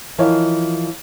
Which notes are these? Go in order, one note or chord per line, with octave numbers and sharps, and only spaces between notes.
E3 F3 A#4 C#5 D#5